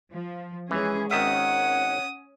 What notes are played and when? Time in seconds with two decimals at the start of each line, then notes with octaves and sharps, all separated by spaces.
0.12 F3
0.71 E3 G#3 C#4 G#4
1.11 G#1 D#3 C#4 E5 F#5 D#6